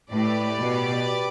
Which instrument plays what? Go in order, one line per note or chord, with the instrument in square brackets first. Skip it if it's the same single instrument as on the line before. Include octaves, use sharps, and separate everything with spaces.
[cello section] A2 [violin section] G4 B4 D5
[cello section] B2